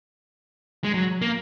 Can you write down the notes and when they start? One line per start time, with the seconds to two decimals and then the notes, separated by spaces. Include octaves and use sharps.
0.84 G#3
0.94 F#3
1.22 A#3